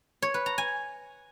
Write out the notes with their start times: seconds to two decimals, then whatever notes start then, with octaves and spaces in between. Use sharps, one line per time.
0.22 C#5
0.34 B4
0.46 A#5
0.58 G#5